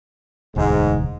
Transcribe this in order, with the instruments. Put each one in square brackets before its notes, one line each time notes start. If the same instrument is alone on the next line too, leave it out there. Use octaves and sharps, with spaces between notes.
[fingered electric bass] E1 D2 [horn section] G#2